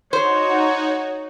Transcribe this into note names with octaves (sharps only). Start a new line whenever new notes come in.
D#4 F#4 C5 C#5